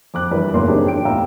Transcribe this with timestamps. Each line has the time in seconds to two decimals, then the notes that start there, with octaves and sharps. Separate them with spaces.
0.14 F2 D6 F#6
0.31 G2 E3 A#4 B4
0.53 F#1 E2 A2 F#3 A#3 C6
0.68 F#3 C4 D4 D#4 G4 G#4
0.87 G5 D7
1.05 E2 A2 F5 G5 A#5 E6